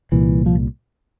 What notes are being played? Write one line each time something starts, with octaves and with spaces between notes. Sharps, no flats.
C2 A#2 E3
F3